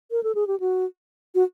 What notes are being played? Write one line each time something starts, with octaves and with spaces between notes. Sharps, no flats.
A#4
A4
G#4
G4
F#4
F#4